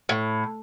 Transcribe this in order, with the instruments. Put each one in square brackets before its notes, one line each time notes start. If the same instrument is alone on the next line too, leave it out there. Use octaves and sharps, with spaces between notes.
[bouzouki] A2